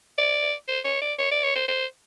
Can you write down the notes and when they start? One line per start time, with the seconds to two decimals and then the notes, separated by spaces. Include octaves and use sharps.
0.18 D5
0.68 C5
0.85 C#5
1.01 D5
1.19 C#5
1.31 D5
1.43 C#5
1.56 C5
1.68 C5